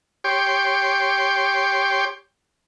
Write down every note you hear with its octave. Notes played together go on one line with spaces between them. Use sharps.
G4 C#5 G5 C6 D6